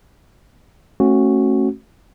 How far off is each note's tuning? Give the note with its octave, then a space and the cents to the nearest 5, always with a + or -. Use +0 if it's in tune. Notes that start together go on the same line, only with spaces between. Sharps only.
A3 +0 C#4 -30 F#4 +0